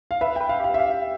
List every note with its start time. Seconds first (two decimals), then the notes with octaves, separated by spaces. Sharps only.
0.11 F5
0.21 B4 E5
0.36 B4 G5
0.49 F5
0.60 G4 F5
0.74 E5
0.79 F5